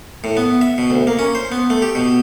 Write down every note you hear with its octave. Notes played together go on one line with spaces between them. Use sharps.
A2
B3
E5
B2
D2
A#3
C#4
C5
B3
A3
G4
B2